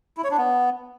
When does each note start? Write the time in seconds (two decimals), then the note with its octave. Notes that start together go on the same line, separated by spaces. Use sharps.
0.17 E4
0.24 C#5
0.31 D4
0.38 B3